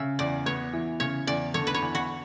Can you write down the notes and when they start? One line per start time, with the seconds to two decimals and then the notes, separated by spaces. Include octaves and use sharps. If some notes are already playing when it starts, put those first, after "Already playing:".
Already playing: C#3 E5
0.19 E2 D5
0.46 B3 C#5
0.73 E3
1.00 C#3 C#5
1.27 E2 D5
1.54 D3 C#5
1.67 B4
1.74 C#5
1.82 E2
1.95 F#4